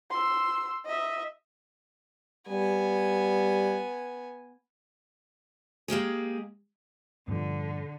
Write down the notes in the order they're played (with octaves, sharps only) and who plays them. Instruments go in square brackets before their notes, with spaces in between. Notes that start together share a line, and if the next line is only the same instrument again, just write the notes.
[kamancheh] C6 E6
D#5 E5
[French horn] G3 [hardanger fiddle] B3 G#5
[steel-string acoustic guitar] G#3 A#3 G4 G#4
[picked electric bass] G2 A#2 F3 [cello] D3